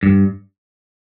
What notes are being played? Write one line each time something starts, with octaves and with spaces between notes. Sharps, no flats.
G2